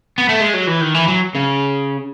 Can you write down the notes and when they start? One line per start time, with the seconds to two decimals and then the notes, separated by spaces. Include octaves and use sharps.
0.18 B3
0.29 A3
0.40 G#3
0.54 F#3
0.67 E3
0.81 D#3
0.94 E3
1.08 F#3
1.35 C#3